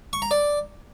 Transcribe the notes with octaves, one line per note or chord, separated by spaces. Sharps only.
C#6
A#5
D5